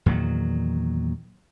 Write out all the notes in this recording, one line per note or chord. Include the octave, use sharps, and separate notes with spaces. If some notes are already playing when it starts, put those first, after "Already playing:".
E2 A#2 D#3 F#3